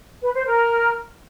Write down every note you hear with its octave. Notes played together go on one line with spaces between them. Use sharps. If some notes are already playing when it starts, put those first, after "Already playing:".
B4
C5
A#4